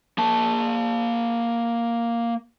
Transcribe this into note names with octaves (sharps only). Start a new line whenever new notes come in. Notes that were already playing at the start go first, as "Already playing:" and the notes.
A#3 A5